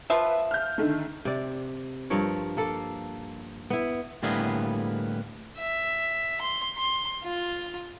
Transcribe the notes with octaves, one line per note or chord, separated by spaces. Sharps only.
F3 F4 B4 E5
F6 G6
D3 D#3 A3
C3 D5
G2 F3 A#4 C#5
A#3 A4
B3 E4
A2 D3 G3 A#3 B3 G#4
E5
C6
C6
F4